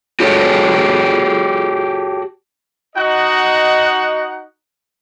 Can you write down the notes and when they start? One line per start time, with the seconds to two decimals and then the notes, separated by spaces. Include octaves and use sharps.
0.20 F#4 G4 A4 C#5
2.96 D#4 F#4 D#5 F#5